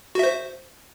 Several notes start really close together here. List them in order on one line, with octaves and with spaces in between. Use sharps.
F#4 E5 C5